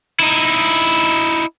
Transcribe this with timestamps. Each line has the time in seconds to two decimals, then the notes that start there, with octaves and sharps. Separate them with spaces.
0.20 D#4 E4